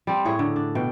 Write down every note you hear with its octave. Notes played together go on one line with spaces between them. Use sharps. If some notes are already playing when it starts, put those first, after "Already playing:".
G3 C4
A2 G#4 C#5
D3
D4
B2 G5